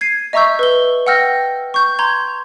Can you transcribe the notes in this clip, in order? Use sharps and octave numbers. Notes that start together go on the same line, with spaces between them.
G#6 C7 D#7
D#5 E5 A#5 C#6 E6 G6
B4 E6 G7
F#5 G5 E6 F6 G6 A#6
C#6 G6
A#5 C6 G6 G#6